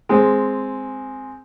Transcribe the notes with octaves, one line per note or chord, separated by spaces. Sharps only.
G#3 C4